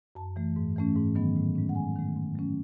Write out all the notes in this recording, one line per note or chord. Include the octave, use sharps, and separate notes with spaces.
F#2 A5
E3 A3
G#2
E3 A3 C#4
G#2
D#3 F#3 B3
A2
G#3 C#4
F#5
G#2 G#5
D#3 A3
G#2
F#3 A3 C#4